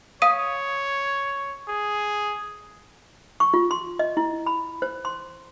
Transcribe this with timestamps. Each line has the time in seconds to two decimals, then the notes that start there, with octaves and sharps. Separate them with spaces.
0.22 C#5 F5 D#6 D#7
1.68 G#4
3.40 C#6
3.54 F4
3.71 C6
3.99 D#5
4.17 E4
4.46 B5
4.82 C5
5.05 C6